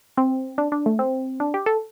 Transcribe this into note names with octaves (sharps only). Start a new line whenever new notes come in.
C4
D4
D4
A3
C4
D4
G4
A4